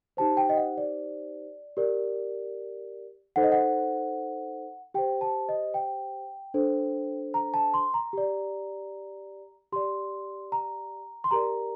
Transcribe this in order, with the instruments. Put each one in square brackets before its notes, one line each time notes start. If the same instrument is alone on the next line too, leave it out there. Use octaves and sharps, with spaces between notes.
[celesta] D#4 G4 C5 A5
G5
D#5
F#5
D5
G4 A#4 D5
D#4 A4 C5 F#5
D#5
F#5
G4 C5 G5
A5
D#5
G5
D4 A4 C5
A#5
A5
C6
A#5
G4 D5
G4 D5 C6
A#5
C6
G4 A#4 D5 A#5